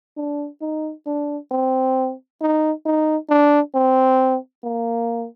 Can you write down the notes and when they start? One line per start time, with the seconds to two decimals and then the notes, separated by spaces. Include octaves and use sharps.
0.17 D4
0.61 D#4
1.06 D4
1.51 C4
2.41 D#4
2.86 D#4
3.29 D4
3.74 C4
4.64 A#3